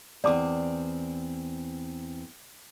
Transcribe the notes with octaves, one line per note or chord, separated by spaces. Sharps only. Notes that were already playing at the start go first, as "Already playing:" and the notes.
E2 C4 D5 A5 D6